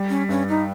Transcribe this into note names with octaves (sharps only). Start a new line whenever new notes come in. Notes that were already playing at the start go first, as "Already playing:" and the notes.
Already playing: G3
C#4
G2 C#4
D#4